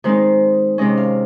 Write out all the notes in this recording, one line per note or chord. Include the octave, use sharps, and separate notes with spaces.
D#3 G#3 C4 D#4 C5
C3 D#3 G#3 C#4 D#5
F5